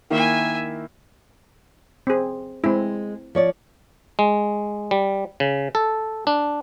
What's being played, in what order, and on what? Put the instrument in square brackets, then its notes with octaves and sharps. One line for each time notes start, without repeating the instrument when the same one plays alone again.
[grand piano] D#3 A#3 E4 [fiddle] E5 G#5
[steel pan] C4 G#4
[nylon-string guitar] G#3 [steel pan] C4 E4
[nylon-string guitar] F3 C#5 D5
[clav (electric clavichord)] G#3
G3
C#3
A4
D4